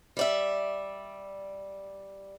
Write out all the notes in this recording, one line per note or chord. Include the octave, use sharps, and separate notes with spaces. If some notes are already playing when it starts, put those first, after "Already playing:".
G3 D5 E5